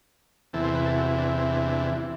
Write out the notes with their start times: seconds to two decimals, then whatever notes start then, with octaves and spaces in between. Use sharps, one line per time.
0.53 E2 C3 E3 A4
0.64 C5
0.75 B4
0.86 A4
0.96 F#4
1.18 D4
1.39 C4
1.53 D4
1.68 D4